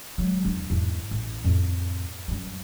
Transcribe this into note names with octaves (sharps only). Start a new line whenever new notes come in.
F#3 G#3
E2 D4
E2 G#2
A1
F2 A2
F#2 G3